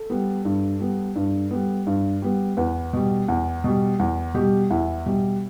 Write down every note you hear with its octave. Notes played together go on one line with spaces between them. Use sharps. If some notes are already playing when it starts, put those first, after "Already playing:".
Already playing: A4
G3 B3
G2
G3 B3
G2
G3 B3
G2
G3 B3
E2 B4
B2 G3
E2
B2 G3
E2
B2 G3 G4
E2 E4
B2 G3